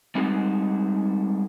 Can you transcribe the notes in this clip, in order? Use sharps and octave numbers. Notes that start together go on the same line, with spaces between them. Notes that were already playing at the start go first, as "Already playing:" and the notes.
G3 G#3 C4 D#4 F#4 A4